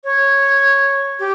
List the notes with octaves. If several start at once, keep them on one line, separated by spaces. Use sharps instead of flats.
C#5
G4